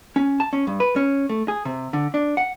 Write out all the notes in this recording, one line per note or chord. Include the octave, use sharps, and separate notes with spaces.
C#4
A5
C#4
G2
B4
C#4
A3
G#4
C3
D3
D4
F#5